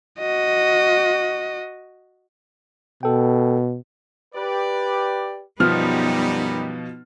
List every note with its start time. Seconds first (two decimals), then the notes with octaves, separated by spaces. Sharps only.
0.19 F#4 D#5
3.03 B2 A4 G5
4.35 G4 B4 D5
5.60 F#2 B2 F3 G3 B3 D#4 F6